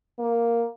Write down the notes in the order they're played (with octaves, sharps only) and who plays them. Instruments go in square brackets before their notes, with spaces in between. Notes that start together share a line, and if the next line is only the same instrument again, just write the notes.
[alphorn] A#3